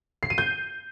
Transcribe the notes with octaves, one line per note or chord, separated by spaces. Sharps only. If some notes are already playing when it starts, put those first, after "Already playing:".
C7
D#7
G6